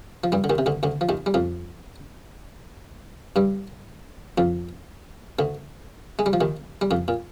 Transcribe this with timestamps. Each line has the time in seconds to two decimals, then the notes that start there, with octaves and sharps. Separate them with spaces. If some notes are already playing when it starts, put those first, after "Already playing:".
0.24 F3
0.32 G2 G3
0.44 D3
0.50 D#2 D#3
0.58 C3
0.66 D2 D3
0.83 D2 D3
1.01 F3
1.09 D#2 D#3
1.26 G3
1.34 F2 F3
3.36 G2 G3
4.38 F2 F3
5.39 D2 D3
6.19 G#3
6.26 G3
6.33 F3
6.41 D#2 D#3
6.81 G3
6.91 F2 F3
7.08 A#2